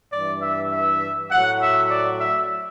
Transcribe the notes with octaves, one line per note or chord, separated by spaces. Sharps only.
G2 E3 D5
E5
E5
A2 F#3 F#5
E5
D5
E5